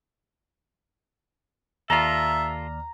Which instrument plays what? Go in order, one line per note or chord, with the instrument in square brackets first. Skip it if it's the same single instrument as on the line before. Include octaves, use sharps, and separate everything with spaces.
[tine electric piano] D#2 D5 F6 [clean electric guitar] F4 A4 [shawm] E5 [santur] A#5